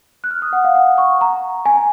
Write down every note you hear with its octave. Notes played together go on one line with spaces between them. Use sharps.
F#6
F6
D#6
F#5
F5
F#5
C#6
A#5
G#5
A#5